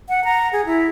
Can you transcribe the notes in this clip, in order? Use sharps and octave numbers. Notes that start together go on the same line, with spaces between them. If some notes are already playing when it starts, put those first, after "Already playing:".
F#5
A#5
G#4
E4